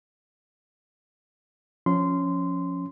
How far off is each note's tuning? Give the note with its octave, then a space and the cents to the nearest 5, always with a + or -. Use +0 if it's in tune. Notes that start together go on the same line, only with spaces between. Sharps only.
F3 +15 C#4 +0 C6 -15